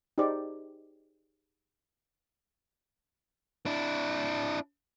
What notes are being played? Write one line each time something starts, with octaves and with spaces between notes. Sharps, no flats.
D#4 G4 G#4 C5 D5
D4 E4